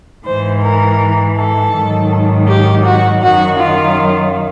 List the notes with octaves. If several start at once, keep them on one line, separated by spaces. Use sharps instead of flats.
G#2 E3 C5
A#4
A4
G#2 D#3 F#3
G4
F#4
F#2 D#3 F#3 F#4
F4